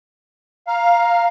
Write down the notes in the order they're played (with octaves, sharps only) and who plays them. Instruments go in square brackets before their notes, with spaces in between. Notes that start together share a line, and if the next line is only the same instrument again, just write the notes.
[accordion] F5 [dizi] A#5